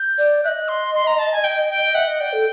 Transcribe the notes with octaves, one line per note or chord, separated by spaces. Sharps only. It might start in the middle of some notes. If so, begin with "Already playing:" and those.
Already playing: G6
D5
D#5 E5 F#6
C6
C6
A#5
A5
G#5
G5
G5
D#5
E5 F#5
D#5
D5 G5
A4